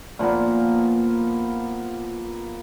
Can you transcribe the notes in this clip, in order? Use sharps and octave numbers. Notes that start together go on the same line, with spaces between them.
A#2 F3 A#3 B3